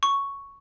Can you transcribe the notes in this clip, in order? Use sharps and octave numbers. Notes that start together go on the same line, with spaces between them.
C#6